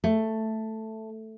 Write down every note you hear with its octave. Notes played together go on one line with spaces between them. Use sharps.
A3